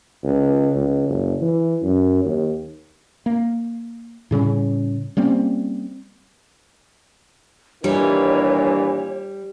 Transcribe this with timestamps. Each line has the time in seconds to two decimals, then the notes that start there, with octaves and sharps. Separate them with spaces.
0.23 C#2
0.76 C#2
1.09 F#1
1.41 E3
1.83 F#2
2.25 D#2
3.26 A#3
4.31 A2 C#3 G3 C#4
5.17 G3 A#3 C4 C#4
7.84 G2 A#2 D#3 E3 G3 C#5